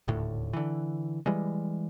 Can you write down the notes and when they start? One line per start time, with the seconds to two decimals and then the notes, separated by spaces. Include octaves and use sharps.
0.08 D#1 D2 A2
0.53 D3 E3
1.26 E3 G3 G#3